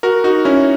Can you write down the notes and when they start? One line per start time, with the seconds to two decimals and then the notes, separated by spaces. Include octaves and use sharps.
0.03 F#4 A#4
0.24 D#4 F#4
0.45 C#4 E4